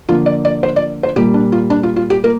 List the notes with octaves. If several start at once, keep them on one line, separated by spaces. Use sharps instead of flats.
D3 F3 A#3 F4
D5
D5
C5
D5
C5
A#2 G3 A#3 G4
D4
F4
D4
F4
F4
G4
A#3 A#4